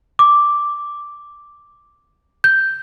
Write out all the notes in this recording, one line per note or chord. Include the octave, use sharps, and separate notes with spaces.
D6
G6